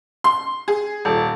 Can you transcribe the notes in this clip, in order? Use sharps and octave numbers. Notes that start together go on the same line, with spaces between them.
C6
G#4
D#1